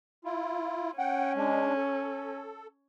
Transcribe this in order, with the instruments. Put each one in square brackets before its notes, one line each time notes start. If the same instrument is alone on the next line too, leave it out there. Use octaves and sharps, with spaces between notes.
[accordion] E4 F4
[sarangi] C#4 [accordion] F#5 G5
[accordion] G#3 D4
A4